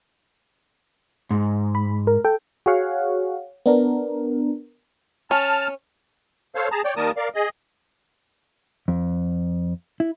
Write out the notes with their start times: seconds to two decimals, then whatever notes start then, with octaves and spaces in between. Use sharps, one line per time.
1.31 G#2
1.75 B5
2.07 A#4
2.25 A4 G5
2.66 F#4 G#4 C#5 F5 F#5
3.66 B3 D4 A#4
5.31 C#4 A5 F6
6.55 A4 C5 C#5 F5
6.71 G#4 A5 A#5
6.84 C#5 D5 G5
6.96 D#3 G3 A#3 A#4 A5 D#6
7.17 A#4 D5 F5
7.35 G#4 D#5
8.88 F2
10.00 E4